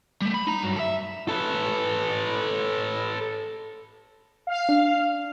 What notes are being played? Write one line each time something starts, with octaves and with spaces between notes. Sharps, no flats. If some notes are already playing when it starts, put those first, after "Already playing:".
G3 A3
B5
D#4 A#5
G2 F#3
A4 E5
A4 B4
F5
D4